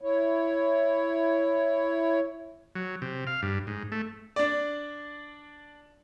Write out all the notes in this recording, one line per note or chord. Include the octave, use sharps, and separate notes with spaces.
E4 C#5
F#3
C3
F5
G2
G#2
A3
D4 D5